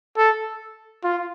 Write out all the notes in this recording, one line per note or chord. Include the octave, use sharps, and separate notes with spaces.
A4
F4